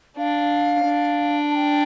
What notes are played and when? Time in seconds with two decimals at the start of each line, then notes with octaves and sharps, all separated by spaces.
0.17 D4 F5
0.84 D4
1.50 A5
1.55 G5